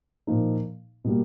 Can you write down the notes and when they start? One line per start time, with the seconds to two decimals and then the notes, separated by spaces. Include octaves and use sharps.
0.27 A#2 F3 A#3 D#4
1.04 B2 G3 A#3